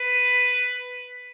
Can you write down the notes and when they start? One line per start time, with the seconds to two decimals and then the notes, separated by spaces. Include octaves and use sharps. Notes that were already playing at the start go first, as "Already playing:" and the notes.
Already playing: B4